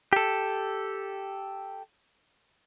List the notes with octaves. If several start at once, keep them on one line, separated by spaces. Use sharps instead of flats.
G4 A4